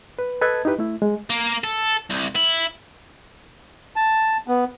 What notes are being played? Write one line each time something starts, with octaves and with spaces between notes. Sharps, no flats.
B4
A4 B4 D#5 A5 G#6
D#4 E4 G4 B4
A3 E4
G#3
A#3
A4
C2
E4
A5
B3